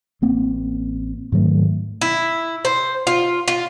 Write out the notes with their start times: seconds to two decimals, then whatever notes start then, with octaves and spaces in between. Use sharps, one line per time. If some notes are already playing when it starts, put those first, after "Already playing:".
0.22 A1 A#3 C4
1.32 G#2 D#3 F#3 A3
2.01 E4
2.65 C5
3.07 F4
3.48 F4